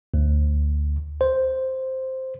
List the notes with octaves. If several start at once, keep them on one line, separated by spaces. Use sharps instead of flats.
D2
C5